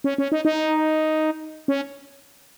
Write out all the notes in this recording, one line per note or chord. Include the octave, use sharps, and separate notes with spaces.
C#4
C#4
D#4
D#4
C#4